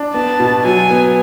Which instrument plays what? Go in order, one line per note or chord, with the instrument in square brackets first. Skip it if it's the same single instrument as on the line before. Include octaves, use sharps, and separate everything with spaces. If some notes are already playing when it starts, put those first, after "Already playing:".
Already playing: [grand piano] D4
[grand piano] B3 [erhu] A5
[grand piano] B2
[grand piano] F#3 [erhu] G#5
[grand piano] B3